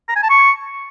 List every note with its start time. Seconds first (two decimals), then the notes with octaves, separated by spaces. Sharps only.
0.08 A#5
0.16 G#5
0.23 A5
0.30 C#6